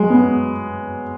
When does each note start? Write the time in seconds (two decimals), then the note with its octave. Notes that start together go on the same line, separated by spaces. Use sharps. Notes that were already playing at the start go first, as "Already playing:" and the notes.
Already playing: F#3 G#3
0.10 B3